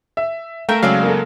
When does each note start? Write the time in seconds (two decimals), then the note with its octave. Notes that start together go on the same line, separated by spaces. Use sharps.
0.17 E5
0.69 A3 A#4 E5 F5 G5
0.83 C#3 F#3 G#3 C4 D5 F5
1.03 A#3 A4